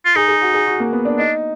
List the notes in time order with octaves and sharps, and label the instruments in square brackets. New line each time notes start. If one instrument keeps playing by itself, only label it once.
[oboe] F4
[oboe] D#4 [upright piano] G#4
[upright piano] G#4
F#4
G#4
F#4
A#3
B3
D4
[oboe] D4 [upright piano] D#4